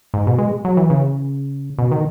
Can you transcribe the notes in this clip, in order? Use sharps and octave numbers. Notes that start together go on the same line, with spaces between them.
G#2
B2
G#3
F#3
E3
C#3
B2
D#3